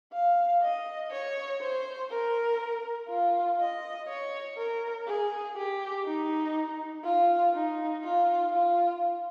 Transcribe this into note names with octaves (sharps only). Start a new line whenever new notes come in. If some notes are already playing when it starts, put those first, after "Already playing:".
F5
D#5
C#5
C5
A#4
F4
D#5
C#5
A#4
G#4
G4
D#4
F4
D#4
F4
F4